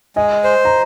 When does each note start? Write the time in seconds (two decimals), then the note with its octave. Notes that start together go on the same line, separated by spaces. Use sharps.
0.16 G#3 D#5 G#5
0.44 C5
0.65 A#5